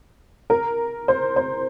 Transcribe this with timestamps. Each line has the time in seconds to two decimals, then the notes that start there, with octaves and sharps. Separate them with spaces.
0.50 A#4
1.08 C5
1.36 C5